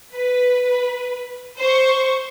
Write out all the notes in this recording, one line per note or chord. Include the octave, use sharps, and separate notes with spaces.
B4
C5 C#6